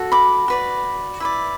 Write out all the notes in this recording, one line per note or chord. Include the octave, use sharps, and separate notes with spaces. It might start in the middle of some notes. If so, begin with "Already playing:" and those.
Already playing: F#4 A4
B5 D6
F#4 B4 D5
E4 B4 D5